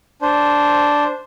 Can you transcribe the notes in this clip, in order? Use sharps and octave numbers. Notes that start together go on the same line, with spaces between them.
D4 C5